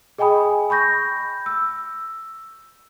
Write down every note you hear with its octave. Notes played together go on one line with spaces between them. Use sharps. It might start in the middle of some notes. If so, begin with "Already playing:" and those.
G#4 D#5 G5 G#5 B5 D#6
B5 C#6 G6 A#6
E6